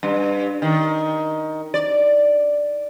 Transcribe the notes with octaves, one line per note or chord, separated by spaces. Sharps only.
G2
D#3
D5